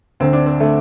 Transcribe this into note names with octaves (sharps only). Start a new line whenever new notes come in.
D2 D3 C4
D4
C4
D3 A3